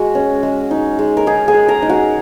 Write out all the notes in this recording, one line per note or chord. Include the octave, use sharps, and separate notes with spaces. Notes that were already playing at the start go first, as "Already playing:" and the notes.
Already playing: G#3 F#4
C#4
G#3
D#4
G#3
A#4
D#4 G#4
G#4 G#5
G#3
A#4 A#5
D#4
F#4 F#5